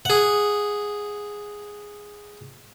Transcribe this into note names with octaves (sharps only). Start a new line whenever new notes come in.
G#4 F#5